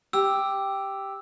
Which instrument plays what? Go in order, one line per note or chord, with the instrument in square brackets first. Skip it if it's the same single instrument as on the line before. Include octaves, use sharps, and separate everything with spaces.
[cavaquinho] G4 [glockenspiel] E6